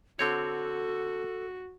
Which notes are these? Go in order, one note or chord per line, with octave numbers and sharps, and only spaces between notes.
D3 C4 F#4 A4 C#5